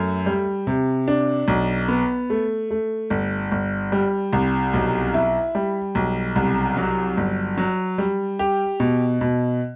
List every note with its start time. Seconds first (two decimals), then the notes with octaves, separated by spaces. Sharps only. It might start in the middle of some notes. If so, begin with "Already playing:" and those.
Already playing: F#2 A3
0.26 G3
0.67 C3
1.08 D4
1.48 B1
1.88 B3
2.30 A3
2.71 A3
3.10 G1
3.52 G1
3.92 G3
4.33 C2
4.74 B1
5.14 E4
5.55 G3
5.95 B1
6.36 C2
6.77 F#3
7.17 G1
7.57 F#3
7.98 G3
8.39 G4
8.80 B2
9.21 B2